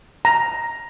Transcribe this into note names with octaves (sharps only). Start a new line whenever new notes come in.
A#5